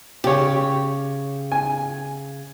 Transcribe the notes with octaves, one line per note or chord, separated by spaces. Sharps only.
C#3 G4 C#5
G#5